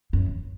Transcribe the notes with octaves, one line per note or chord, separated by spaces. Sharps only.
F#2